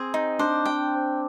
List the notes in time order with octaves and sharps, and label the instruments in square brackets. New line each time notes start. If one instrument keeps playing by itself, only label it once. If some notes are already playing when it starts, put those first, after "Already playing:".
Already playing: [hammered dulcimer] C4 [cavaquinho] G#4
[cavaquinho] D#4
[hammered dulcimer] D4 [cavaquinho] C5
[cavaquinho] G5